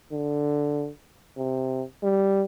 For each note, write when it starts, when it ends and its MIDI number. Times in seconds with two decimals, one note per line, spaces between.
0.12 0.89 50
1.37 1.83 48
2.03 2.44 55